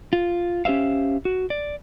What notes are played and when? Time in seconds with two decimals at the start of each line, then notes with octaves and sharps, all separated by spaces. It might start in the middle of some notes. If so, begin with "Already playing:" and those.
0.13 F4
0.65 C#4 G4 C5 E5 F5
1.25 F#4
1.50 D5